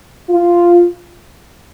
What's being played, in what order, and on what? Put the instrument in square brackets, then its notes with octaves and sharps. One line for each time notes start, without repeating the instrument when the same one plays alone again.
[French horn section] F4